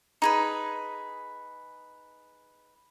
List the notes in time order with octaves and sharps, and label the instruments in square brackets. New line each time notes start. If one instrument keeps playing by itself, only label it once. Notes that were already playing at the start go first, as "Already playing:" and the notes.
[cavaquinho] D#4 G#4 B4